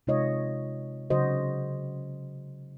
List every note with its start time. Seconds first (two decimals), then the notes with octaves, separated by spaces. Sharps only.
0.07 C3 G#3 D#4 F4 C#5 D#5
1.10 C#3 F#3 F#4 C5 D#5